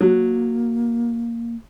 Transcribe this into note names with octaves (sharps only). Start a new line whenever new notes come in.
F#3 A#3